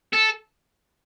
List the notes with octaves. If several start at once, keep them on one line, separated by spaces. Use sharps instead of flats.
A4